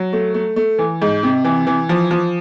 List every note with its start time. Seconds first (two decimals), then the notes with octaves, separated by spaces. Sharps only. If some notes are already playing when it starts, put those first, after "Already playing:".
Already playing: F#3
0.13 A3
0.34 A3
0.56 A3
0.78 E3
1.02 G#2
1.23 C3
1.45 E3
1.67 E3
1.89 F3
2.11 F3